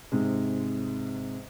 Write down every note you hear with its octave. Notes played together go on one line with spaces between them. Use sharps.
G#2 C3 G#3